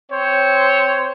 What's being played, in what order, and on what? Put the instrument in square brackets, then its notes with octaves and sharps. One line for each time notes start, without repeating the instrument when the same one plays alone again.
[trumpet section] C4 C5 C#5